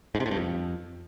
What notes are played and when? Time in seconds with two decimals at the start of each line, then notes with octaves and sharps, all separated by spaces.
0.15 G#2
0.20 C3
0.26 A2
0.31 G2
0.37 F2